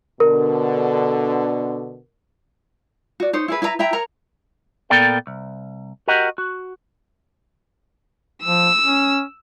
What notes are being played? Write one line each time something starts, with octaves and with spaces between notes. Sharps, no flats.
B2 D3 A#4
F#4 D5
D#4 C5 C#5
E4 G#4 B4
E4 B4 D5 A#5
E4 E5 G5 A#5
A#4 C#5 A#5
A#2 B3 A4 A#4 D5 G5
C2
F#4 G4 A#4 D#5 F#5
F#4
F3 E6
C#4